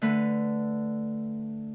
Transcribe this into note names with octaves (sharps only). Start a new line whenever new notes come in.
D3 A3 B4